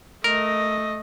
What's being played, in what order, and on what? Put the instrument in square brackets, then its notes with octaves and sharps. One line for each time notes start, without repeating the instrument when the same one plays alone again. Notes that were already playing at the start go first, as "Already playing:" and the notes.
[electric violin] A3 D#5 [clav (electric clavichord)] A#4